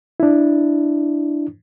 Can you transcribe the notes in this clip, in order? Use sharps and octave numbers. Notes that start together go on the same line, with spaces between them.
D4 E4